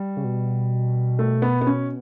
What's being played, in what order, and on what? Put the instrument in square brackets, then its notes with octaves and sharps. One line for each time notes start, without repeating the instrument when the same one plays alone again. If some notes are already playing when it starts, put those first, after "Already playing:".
Already playing: [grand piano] G3
[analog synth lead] C#3
B2
[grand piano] A3
B3
B3
C#4